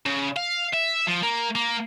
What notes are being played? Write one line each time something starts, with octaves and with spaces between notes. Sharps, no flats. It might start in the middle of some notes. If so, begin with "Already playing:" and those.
C#3
F5
E5
F3
A#3
A#3